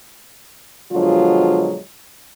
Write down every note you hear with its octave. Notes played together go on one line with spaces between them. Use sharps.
B2 D3 F3 F#3 G#3 F4